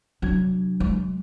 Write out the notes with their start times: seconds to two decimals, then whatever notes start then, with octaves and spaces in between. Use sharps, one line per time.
0.22 C3 F#3 D4 G#6
0.80 G#3